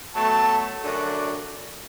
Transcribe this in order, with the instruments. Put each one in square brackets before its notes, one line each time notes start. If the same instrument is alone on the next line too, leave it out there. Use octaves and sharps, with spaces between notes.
[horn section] B2 F#3 A3 [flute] A5
[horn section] F#2 D3 A3 D4 F#4